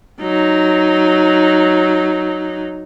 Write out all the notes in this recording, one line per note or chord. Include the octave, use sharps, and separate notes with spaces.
F#3 D#4